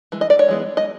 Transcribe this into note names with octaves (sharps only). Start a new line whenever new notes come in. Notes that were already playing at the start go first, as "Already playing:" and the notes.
E3 G#3
D#5
D5
C#5
E3 G#3 B3
D#5